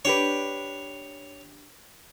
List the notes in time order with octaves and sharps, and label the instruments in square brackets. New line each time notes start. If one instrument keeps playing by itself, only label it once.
[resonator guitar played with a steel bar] D4 G4 B4 [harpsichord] C#5